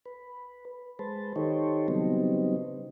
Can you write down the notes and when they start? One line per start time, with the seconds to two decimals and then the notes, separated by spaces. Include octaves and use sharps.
0.06 B4
0.99 G#3 B4 C5 A5
1.36 D#3 D#4 G4 A4 C5 C#5
1.88 C#3 F#3 G3 B3 C4 D#4